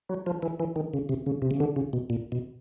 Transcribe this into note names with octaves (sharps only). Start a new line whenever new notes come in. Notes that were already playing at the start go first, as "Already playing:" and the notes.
F#3
F3
E3
E3
D#3
C#3
C3
C#3
C3
C#3
D3
C#3
B2
A#2
B2